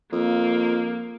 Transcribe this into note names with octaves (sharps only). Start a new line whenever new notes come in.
F2 A#3